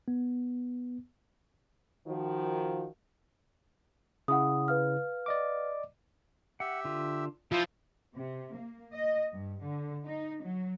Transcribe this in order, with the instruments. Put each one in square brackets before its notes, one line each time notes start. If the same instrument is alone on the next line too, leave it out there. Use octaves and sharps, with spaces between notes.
[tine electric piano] B3
[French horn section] D#3 F3 F#4
[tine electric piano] C#3 E4 [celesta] F#5 D#6
[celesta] B4 F5 F6
[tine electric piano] D5 D#5 D6
[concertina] G4 E5 [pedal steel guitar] F#5
[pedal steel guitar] D3 F4
[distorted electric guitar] F3 [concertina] E4 [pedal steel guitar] F4
[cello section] C3
A#3
D#5
G2
D3
D#4
F#3